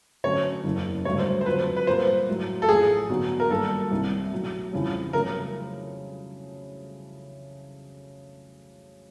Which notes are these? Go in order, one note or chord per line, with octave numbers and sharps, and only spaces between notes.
D3 F#3 A3 C#4 C#5
F#1 E2 C#3
G#1 G2 D3 F#3 A3 C#5
C5
C5
F2 D3 F#3 B4
B4
A#2 G3 A#3 C5
A2 F#3 A3
A4
A1 A2 F3 G#4
D3 F#3 B3 D#4 F#4
A#4
G1 G2 D#3 F#3 A#3 A4
C2 C3 D#3
B2 F#3 A3
G1 F2 C#3 E3
C#3 F#3 A3 A#4